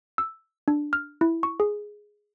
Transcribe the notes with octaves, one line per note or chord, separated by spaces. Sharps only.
E6
D4
F6
E4
C#6
G#4